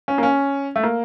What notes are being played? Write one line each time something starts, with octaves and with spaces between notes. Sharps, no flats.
C#4
A#3
C#4
A3
A#3